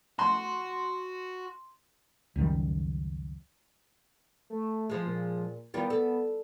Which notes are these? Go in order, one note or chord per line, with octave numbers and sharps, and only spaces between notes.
F#4 C6
C#2 F#2 D#3 G3
A3
F3 G#3
A#2
D#3 G3 B3 F4
A4